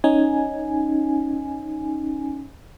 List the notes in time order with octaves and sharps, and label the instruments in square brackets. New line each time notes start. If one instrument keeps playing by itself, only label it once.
[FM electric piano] C#4 D#4 G#5